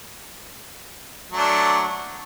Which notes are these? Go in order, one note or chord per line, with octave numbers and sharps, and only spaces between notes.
F#3 A3 D4